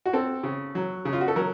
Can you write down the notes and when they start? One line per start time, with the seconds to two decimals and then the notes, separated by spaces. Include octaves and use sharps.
0.06 F#4
0.13 C4 A4
0.43 C#3
0.75 F#3
1.05 C#3
1.13 F4
1.21 F#4
1.28 A4
1.36 F#3 A#4